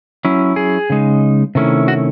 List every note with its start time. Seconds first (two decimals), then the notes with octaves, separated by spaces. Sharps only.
0.25 F#3 C#4 E4
0.56 G#4
0.90 C#3 G#3 D#4
1.55 C3 D#3 A3 C#4 E4
1.88 F#4